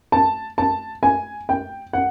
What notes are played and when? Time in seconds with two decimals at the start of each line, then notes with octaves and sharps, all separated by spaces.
0.12 A5
0.58 A5
1.03 G#5
1.49 G5
1.93 F#5